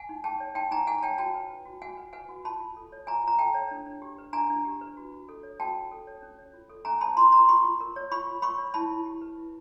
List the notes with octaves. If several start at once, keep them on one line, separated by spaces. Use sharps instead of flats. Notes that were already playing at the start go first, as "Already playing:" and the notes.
Already playing: F#5 G#5
D#4
G#4 G5 A5
C#5
D#4 G5 A5
D#4 G#5 A#5
G#4 F#5 G#5
C#5 G5 A5
F#4 G5 A5
B4
B4
F#4
F#4 F#5 G#5
B4
B4 F#5 G#5
F#4
F4 A5 B5
F4
A4
C#5
F4 G#5 A#5
F4 A#5
A4 G5 A5
C#5
D4
D4
G4
B4
D4 G#5 A#5
D4
G4
B4
F#4
F#4
A4
C#5
F#4 G5 A5
F#4
A4
C#5
C#4
C#5
F4
A4
C#4 G#5 A#5
C#5 A5 B5
F4 A#5 C6
A4 A#5 C6
F4 B5 C#6
F4
A#4
C#5
F4 B5 C#6
F4
A#4 B5 C#6
C#5
E4 A5 B5
E4
G4
B4
E4